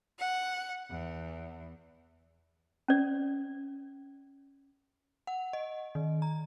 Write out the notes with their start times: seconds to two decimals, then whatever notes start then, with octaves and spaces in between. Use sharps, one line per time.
0.18 F#5
0.90 E2
2.88 C#4 D5
5.27 F#5
5.53 D#5
5.95 D#3
6.22 A#5